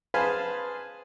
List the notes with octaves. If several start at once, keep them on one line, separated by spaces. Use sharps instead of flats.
G#4 B4 C5 F5 G#5 A5